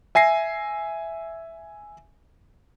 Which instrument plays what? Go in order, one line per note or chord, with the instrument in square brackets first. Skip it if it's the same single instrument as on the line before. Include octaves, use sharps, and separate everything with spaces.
[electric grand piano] E5 G#5 A#6 C7